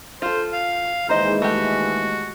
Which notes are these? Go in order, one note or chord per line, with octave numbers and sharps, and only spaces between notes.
F4 A4 C5
F5
D#2 E3 G#3 D#4 C5 D#5
A3 F#4 G4